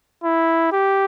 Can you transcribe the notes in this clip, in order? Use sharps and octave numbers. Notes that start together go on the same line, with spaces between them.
E4
G4